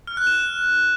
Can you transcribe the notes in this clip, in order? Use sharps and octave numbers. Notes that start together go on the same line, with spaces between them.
F6
F#6
E7